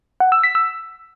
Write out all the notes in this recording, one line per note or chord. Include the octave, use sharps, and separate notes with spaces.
F#5
E6
B6
E6